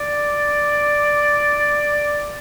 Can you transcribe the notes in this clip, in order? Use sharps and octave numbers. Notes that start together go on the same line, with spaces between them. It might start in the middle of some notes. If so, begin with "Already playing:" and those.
Already playing: D5